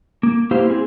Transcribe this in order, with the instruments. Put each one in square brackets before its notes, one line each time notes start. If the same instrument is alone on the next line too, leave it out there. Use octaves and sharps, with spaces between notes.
[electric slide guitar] A#3
A#3 E4 G4 C5 F5
C4 G#4